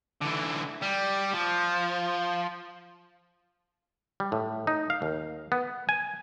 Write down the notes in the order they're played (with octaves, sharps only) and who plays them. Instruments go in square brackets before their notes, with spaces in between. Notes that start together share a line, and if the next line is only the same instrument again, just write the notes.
[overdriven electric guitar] D3 E3
G3
F3
[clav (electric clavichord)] G3
A2
D#4
F5
D#2
B3
G#5